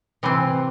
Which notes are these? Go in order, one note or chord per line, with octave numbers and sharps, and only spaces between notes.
C3 E3 C4